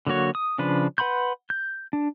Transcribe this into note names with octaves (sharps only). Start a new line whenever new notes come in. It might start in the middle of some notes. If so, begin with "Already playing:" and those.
D3 F#3 A#3 F#4 C#5
D#6
C#3 F3 D4 B4
B4 F#5 B5 C6 G6
G6
D4